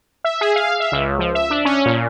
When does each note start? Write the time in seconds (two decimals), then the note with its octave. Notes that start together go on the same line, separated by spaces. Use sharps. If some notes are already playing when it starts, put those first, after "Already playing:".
0.24 E5
0.41 G#4
0.56 F5
0.80 E5
0.92 C#2
1.19 F3
1.35 E5
1.50 D4
1.65 C#4
1.86 A#2